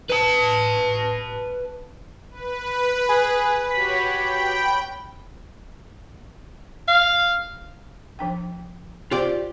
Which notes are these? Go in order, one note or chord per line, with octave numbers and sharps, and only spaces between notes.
B4 A5
B4
G#4
F#4 G4 C#5 B5
G5
F5
F3 D4 G5
F4 G4 C5 D5